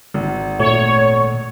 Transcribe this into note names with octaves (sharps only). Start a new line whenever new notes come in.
G#1
A#2 A3 C#5